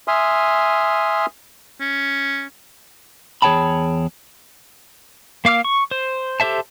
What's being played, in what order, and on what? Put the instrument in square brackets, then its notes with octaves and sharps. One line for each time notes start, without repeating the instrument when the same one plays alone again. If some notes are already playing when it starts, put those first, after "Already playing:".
[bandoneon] E5 G#5 C6 D#6 F6
[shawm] C#4
[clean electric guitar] E2 G#4 C#5 G5 A5 B5
[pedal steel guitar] A#3 F5 D6 F6
C#6
C5
G4 A4 C5 E5 A5